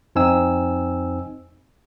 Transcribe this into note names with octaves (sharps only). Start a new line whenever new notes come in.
F2 C4 D#4 G#5 E6